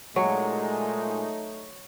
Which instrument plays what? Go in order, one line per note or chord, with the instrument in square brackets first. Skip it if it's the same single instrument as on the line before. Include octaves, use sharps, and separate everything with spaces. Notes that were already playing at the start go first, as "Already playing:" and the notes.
[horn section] A#2 G#3 [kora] F#3 [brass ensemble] A3 D#4 [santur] C#5